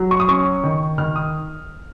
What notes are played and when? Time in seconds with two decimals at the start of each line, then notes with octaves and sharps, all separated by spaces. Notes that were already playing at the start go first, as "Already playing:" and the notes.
Already playing: F#3
0.11 C#6
0.20 D#6
0.28 C#4 C#6
0.64 D#3
0.98 D#3 F6
1.16 D#6